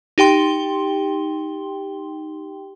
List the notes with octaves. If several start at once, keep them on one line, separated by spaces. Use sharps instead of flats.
D#4 G4 G5 C6 G7